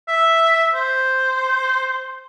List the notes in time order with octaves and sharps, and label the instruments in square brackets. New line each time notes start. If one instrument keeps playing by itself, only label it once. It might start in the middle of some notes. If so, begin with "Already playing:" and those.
[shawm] E5
C5